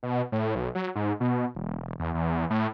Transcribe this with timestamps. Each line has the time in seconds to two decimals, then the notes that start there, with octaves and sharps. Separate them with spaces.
0.03 B2
0.32 A2
0.55 B1
0.75 F#3
0.95 G#2
1.20 B2
1.55 E1
1.99 E2
2.14 E2
2.50 A2